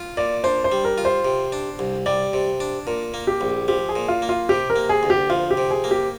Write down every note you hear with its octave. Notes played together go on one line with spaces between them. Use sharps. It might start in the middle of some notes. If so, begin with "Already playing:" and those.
Already playing: F4
A#2 D5
D4 C5
C5
G3
A#4
F4
C5
C3
D4
C2
G3 D5
C3
D4
A#2 A#4
A#3
G4
A#1
F3 G4
G#4
A#2
F4
A#3
F4
C3 G4
A#4
A#3
G#4
D2
G4
F3 F4
G4
C3
G#4
A#3
G4